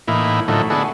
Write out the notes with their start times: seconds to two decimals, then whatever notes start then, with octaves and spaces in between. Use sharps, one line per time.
0.08 A2 E3 A#3 D#4 E4
0.48 A2 D3 F3 F#3 A3 D#4
0.70 B3 D4 E4 F#4 G#4 A4